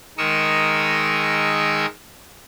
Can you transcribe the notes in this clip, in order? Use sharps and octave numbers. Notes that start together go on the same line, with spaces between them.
D#3 G#3 A#4 C#6 D#6 E6